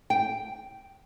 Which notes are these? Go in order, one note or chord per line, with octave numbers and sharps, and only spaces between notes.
G5